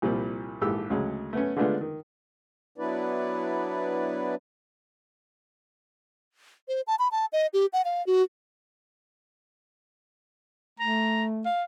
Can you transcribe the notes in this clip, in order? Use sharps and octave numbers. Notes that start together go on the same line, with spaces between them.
C2 A#2 F3 G3
A#1 G#2 E3 G4 A4 E6
D2 C#3 F#3 G#3
A3 B3 C#4
D3 G#3 A3 B3 D4 F4
D#3
F#3 B3 D4 E4 B4 D5
C5
A5
B5
A5
D#5
G4
F#5
F5
F#4
A3 A#5
F5